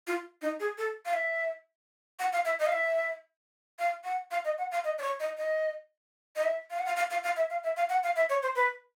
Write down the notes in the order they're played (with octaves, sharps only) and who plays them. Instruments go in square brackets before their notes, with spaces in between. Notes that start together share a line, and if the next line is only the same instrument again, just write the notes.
[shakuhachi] F4
D#4
G#4
A4
F5
E5
F#5
F5
E5
D#5
F5
E5
F5
F#5
F5
D#5
F#5
F5
D#5
D5
C#5
D#5
D#5
D#5
E5
F5
F#5
F5
F5
F5
F5
E5
F5
E5
F5
F#5
F5
E5
C#5
C5
B4